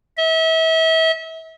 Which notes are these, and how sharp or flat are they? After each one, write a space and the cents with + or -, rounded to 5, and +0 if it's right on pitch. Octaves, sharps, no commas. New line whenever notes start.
E5 -35